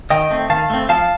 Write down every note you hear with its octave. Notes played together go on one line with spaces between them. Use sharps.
D#3 D#5 G5
A3 C4
D#3 F5 A5
A3 C4
F3 F5 A5